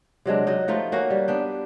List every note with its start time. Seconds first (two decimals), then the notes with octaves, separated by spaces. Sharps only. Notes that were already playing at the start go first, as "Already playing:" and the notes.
0.25 C3 F#3 G#3 D4
0.47 F#3 D#4
0.68 F3 A3 D#4 F4
0.92 A#3 C#4 F#4 A#4
1.10 G3
1.28 B3 D4 G5